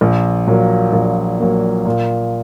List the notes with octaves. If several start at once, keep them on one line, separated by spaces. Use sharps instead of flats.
A#1
A#2 F#3 A#3
A#1
A#2 F#3 A#3
A#2